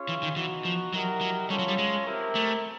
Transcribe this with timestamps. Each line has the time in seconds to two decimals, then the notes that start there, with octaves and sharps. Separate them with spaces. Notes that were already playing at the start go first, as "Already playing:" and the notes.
Already playing: C#4 F4 G#4 C#5 F5
0.09 E3
0.23 D#3
0.36 E3 B3 D#4 F#4
0.65 F3
0.93 F#3 E4 G4 A#4 D#5 F#5
1.21 F#3
1.50 G3 C#4 F4 A4 C#5
1.59 F#3
1.68 G3
1.78 G#3
2.06 C4 E4 G4 A#4
2.35 A3